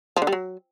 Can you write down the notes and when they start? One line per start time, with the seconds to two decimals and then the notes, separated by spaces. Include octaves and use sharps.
0.17 F3
0.22 D3
0.27 G3
0.32 F#3